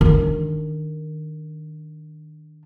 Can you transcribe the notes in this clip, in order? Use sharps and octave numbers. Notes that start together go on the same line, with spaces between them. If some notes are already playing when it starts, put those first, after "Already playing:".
D#3 D4